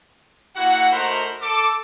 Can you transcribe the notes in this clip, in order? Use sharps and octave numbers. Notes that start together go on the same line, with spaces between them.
A#3 E4 F#4 F#5
A3 D#4 F#4 A#4 C5 B5
A4 D6